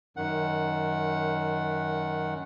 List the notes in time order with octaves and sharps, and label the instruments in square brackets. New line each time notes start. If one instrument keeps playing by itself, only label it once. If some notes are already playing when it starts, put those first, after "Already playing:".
[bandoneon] F#2 D#3 F#5